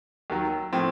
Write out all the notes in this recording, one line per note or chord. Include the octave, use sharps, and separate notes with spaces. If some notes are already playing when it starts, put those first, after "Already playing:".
D#2 D#3 F#3
A2 F3 C4